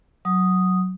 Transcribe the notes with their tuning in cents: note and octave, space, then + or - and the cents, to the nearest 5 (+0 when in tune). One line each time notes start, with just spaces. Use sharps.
F#3 +0 D#6 +0